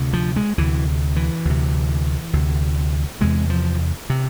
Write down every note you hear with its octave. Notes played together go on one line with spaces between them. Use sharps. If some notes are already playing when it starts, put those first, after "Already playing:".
Already playing: D2 C3
F3
G#3
D2 C3 E3
E3
D2 C3
D2 C3
E2 C3 G#3
F3
C3